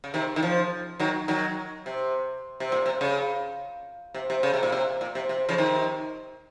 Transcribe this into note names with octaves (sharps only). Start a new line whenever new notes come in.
C#3
C3 D#3
D#3
C#3 F3
D#3 F#3
D#3 F#3
C3
C3
A#2
C3
C#3
C3
C3
C#3
C3
A#2
C3
A#2
C3
C3
C#3 F3
C3 D#3